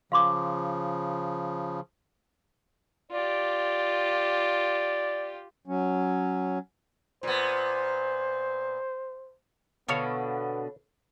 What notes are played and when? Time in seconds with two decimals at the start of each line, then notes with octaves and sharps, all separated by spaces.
0.12 C#3 F3 F5 C6 D6
3.11 F4 G4 D5
5.67 F#3 C#4
7.23 A#2 B3 C5
9.89 B2 D3 B3 A4 C#5 F5